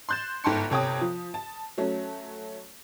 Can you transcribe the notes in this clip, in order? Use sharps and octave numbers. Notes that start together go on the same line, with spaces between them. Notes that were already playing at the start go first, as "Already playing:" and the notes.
C6 F#6 G6 A6 E7
G1 G#2 G5 A5 C6 C#7
G1 C3 C#5 G5 A5 D#6
F3
A5
F#3 A3 C#4